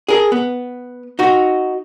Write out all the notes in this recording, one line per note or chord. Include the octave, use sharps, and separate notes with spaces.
G#4 A#4
B3
D#4 F#4